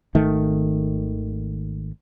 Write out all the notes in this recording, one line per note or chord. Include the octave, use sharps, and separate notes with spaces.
G#1 D#3 A3